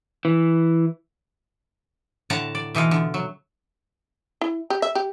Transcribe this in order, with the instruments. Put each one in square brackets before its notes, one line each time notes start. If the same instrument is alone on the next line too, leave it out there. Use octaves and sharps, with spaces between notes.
[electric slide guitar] E3
[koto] A2 D3 F#5 A5 A#5
D5
B2 E3 D#4 F4
D3
F#3
[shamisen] E4
G4
E5
G4